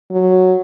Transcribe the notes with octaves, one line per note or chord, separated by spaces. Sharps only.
F#3